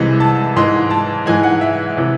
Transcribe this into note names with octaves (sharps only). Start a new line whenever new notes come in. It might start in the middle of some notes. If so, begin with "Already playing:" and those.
Already playing: C2 C3 E3 G#3
A5
G#2 E3 G#3 C6
A5
G#2 E3 G#3 G#5
F#5
E5
C3 E3